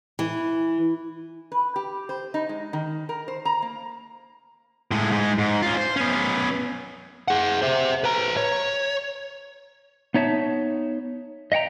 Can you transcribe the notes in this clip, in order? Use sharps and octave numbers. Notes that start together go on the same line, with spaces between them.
E3
B4
G4
C5
D#4
G#3
D#3
A#4
C5
A#5
A#3
A2 G#3
G#2 G#3
G#2
C#4 F4
C5
B3 C#4
G#4 F#5
C5 E5
B4 A#5
C#5
B3 D#4 C#5 E5 A5
D#5 E5 F#5 G5 A#5